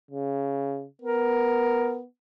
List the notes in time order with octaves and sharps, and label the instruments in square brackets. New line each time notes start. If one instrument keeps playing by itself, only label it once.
[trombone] C#3
[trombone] B3 [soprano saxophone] A#4